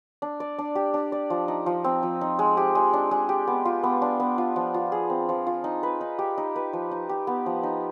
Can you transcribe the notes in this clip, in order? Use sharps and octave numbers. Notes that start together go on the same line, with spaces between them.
D4
D5
D4
G4
D4
D5
F3
D#4
F3
C4
F3
D#4
G#3
G4
G#3
D4
G#3
G4
B3
F4
B3
D4
B3
F4
F3
F4
G#4
C4
F3
F4
D#4
B4
D#4
G4
D#4
B4
F3
D#4
G4
B3
F3
D#4